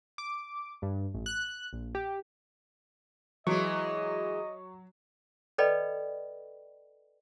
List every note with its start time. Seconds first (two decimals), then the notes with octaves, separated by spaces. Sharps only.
0.18 D6
0.82 G2
1.14 A1
1.26 F#6
1.73 A#1
1.95 G4
3.47 E3 F#3 G#3 D#5 C#6
5.58 A4 B4 D5 D#5 G5 B5